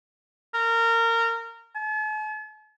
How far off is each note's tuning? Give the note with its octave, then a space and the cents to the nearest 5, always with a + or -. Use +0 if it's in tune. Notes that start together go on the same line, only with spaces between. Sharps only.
A#4 -20
A5 -45